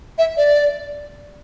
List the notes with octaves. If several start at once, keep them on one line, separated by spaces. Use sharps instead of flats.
E5
D5